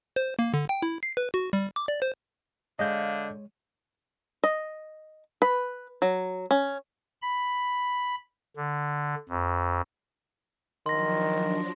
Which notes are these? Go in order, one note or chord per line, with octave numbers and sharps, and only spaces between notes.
C5
A#3
D3
G5
E4
C7
B4
F#4
G3
D6
D5
C5
D3 G#3 C#5 D#5 F5 G6
D#5
B4
F#3
C#4
B5
D3
F2
D#3 F3 F#3 D4 C6 A#6